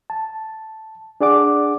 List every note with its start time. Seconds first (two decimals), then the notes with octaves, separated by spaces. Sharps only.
0.10 A5
1.21 D4 G#4 D5 F#5 D6